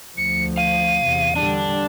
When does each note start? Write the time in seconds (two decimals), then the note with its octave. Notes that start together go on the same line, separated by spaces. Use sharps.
0.17 D2 F3 C#7
0.57 F5 D#7
1.05 E2 C3
1.36 D3 G3 D4